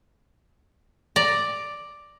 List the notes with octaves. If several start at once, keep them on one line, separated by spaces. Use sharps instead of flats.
D5 A#5